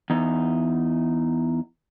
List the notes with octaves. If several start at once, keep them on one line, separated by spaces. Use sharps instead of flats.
E2 D#4